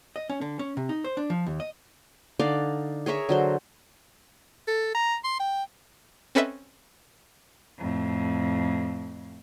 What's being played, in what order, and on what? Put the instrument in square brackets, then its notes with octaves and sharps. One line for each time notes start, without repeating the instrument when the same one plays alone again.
[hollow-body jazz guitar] D#5
C#4
D3
C#4
C3
D#4
C5
D4
F3
D#2
D#5
[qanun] D3 D#4 D5 F5
G#4 A#4 C#5 E5
D3 F#3 C5
[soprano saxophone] A4
A#5
C6
G5
[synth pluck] C4 C#4 A4 B4 D#5 E5
[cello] F2 A2